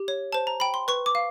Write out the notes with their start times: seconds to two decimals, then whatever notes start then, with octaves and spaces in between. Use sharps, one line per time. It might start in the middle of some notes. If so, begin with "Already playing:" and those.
Already playing: G4
0.08 C#5
0.33 C5 A5
0.47 A#5
0.60 G5 B5
0.74 C6
0.88 B4 C#6
1.06 D6
1.15 F5